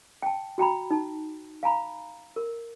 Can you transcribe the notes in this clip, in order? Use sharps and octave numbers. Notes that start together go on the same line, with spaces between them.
G5 A5
F#4 G5 A#5 B5
D#4 A5
F5 G#5 A#5 B5
A#4